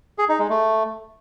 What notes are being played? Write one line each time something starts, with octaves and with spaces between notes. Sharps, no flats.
G#4
D#4
G#3
A3